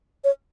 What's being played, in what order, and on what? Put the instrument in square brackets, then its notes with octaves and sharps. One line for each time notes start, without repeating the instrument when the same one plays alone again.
[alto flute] C#5